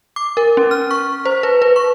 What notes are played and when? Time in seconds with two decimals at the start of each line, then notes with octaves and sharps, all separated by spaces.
0.16 D6
0.37 A#4
0.57 C#4
0.71 F6
0.91 C#6
1.25 C5
1.43 B4
1.62 B4
1.76 C#6